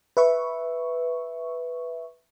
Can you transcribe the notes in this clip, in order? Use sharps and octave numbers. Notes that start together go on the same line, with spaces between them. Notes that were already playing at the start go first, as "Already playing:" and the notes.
B4 E5 C#6